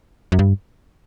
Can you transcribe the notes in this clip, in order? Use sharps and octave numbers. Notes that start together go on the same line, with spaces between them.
F#2
G2